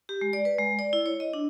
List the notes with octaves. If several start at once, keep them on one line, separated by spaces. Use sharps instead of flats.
G4
G#3
D5
B4
G#3
D5
E4
C#5
D#5
D4